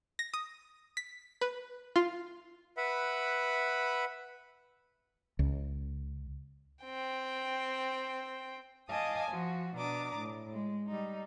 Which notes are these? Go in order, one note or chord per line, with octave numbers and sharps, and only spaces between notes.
A#6
D#6
B6
B4
F4
B4 E5 F#5 B5
C#2
C4 G5
D#5 F5 G#5 A5 D6 D#6
F3 F#4
B2 D4 A#5 D6 D#6
A2
G#3
G3 D#4